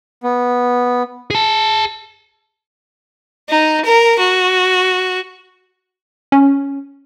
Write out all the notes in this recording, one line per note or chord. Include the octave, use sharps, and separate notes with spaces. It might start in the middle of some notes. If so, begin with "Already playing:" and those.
B3
G#4 A5
D#4
A#4
F#4
C#4